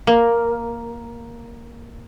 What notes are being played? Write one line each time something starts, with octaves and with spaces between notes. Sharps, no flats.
A#3